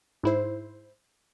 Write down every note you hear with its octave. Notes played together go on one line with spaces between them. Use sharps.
G#2 E4 C5